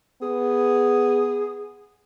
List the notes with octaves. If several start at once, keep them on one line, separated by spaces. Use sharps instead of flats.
B3 G#4